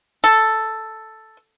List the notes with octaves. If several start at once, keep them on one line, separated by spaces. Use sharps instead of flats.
A4